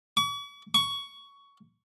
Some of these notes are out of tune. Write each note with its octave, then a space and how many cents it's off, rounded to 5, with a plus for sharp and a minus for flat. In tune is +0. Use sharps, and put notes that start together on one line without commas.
C#6 +45
C#6 +15